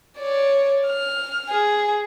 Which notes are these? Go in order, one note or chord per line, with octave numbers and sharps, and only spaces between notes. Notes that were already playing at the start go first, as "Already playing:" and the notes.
C#5 D5
F6
G#4